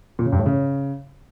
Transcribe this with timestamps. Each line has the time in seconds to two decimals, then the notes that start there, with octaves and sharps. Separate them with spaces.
0.19 A#2
0.26 C#3
0.32 G2
0.39 A2
0.46 C#3